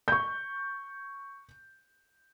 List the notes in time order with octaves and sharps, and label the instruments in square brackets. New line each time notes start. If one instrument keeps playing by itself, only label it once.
[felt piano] C#6 G6